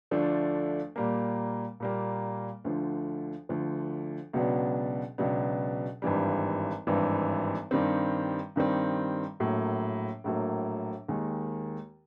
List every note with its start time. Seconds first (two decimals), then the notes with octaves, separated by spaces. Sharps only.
0.11 D2 D3 F3 A3 D4
0.96 A#2 G3 A#3
1.80 A#2 G3 A#3
2.64 D2 D3 F3
3.49 D2 D3 F3
4.33 C#2 B2 F#3 B3 D4
5.18 C#2 B2 F#3 B3 D4
6.02 G#1 G2 E3 G3
6.87 G#1 G2 E3 G3
7.71 G2 D#3 G3 C4
8.56 G2 D#3 G3 C4
9.40 A#1 A2 F#3 A#3
10.24 A#1 A2 F#3 A#3
11.08 D#2 D#3 G#3